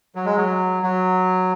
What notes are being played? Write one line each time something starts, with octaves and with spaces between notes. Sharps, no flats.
F#3
G#3
F#3
F#3